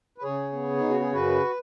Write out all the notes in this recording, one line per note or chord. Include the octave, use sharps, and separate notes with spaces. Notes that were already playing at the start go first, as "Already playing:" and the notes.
B4
C#3 G#4 C#5
B3
C#3 D#4
F#4
G#4
F#2 F#4 B4